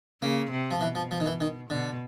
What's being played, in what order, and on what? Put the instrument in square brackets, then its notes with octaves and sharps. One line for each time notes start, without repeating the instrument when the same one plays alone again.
[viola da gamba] C#3 [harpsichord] A#3
[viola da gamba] C3
[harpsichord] F3
[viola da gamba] B2 [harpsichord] E3
[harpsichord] F3
F3
D#3
E3
D#3
[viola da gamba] B2 [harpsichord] D3